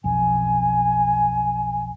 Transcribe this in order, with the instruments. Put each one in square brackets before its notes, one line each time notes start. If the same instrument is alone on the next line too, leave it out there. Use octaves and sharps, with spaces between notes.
[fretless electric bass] B1 F2 [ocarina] G#5